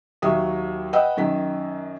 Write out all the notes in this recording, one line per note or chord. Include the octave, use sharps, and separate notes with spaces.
D#2 F#3 E5 D#6
B4 D#5 F#5 G5 D#6 E6
F#2 D#3 B6